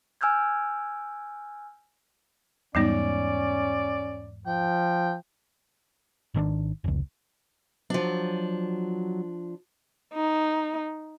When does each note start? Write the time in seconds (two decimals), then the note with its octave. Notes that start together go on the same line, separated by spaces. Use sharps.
0.21 G#5 E6 F6 G6 G#6
2.75 E2 G#2 G3 B3 C#4 D#4 D5
4.46 F3 G5
6.34 G#1 D#3 C4 D4
6.84 F1 C#2
7.90 F3 F#3 D4
10.14 D#4